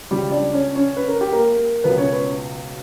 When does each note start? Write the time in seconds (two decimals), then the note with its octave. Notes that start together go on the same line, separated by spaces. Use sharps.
0.11 C#2 C#3 F#3 G3 G4
0.32 D4 D5
0.53 C#4 C#5
0.75 C#4 C#5
0.97 B4
1.08 A#4
1.21 G4
1.32 A#3 A#4
1.84 C#2 B2 F#3 B3 B4
1.98 C#4 C#5
2.12 B3 B4